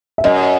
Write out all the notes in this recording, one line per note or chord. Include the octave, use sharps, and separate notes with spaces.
E5
F#2 D#5